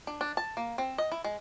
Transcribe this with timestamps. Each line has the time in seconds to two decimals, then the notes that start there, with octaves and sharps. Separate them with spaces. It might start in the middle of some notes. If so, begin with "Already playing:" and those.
0.07 D4
0.21 D4
0.37 A5
0.57 A#3
0.78 C4
0.98 D#5
1.12 E4
1.24 G#3